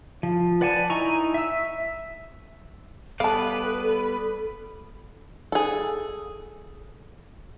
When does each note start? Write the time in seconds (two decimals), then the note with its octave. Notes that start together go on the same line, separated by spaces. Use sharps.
0.23 F3
0.61 B4 D5 F#5 G#5 A5
0.90 D#4 E4 G#5 A#5 C#6
1.34 E5 E6
3.20 G3 B3 A4 B4 D5 F5 A5
5.52 G#4 A4